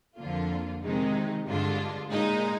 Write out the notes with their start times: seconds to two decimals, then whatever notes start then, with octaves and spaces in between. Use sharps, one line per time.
0.18 F2 D3 F3 A#3 F4
0.82 C3 D#3 G#3 D#4
1.46 G2 D3 G#3 D4 F4
2.10 A#2 G#3 D#4